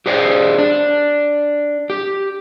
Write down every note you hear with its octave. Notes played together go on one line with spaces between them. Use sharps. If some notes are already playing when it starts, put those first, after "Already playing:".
G4 G#4 C5 D5 G5
D4
G4